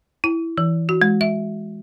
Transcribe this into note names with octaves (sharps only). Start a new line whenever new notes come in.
E4
E3
F#4
G#3
E5